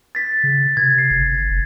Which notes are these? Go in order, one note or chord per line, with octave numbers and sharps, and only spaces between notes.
A6 B6
C#3
C3 G#6
C7
G1
F1